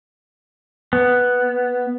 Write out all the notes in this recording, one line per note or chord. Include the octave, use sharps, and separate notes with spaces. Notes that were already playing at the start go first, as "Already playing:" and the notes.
B3